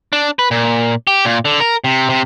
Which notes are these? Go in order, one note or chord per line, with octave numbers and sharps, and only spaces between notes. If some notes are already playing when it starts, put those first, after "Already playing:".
D4
B4
A#2
G4
A#2
D3
A#4
C3
C3